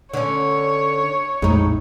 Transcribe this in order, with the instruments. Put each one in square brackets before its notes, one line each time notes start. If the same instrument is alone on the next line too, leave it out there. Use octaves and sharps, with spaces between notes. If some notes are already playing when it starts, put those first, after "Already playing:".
[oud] D3 C#4 [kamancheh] C#5
[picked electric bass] A#1 F2 G#3 [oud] A2 D#4